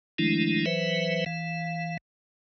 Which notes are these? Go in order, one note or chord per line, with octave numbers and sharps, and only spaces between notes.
D#3 F3 G#3 A3 D4 E4
E3 F#3 B4 C5 E5
E3 F5